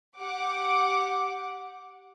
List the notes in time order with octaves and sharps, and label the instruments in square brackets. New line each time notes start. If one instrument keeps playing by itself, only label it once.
[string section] G4 F#5 D6